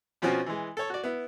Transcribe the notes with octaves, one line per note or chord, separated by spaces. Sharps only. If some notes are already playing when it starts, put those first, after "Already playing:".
B2 F3 C4 C#4 F#4
E3 G#3
A4 C#5
F#4 D5
B3 E4